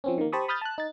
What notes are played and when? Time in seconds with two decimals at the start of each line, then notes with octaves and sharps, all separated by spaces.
0.04 F3 C4 C#4
0.18 D#3 A#3
0.33 G4 C5 A5 B5 C#6 D#6
0.48 B5 D#6 F6 G6 A6
0.61 A5 F#6
0.78 D#4 A6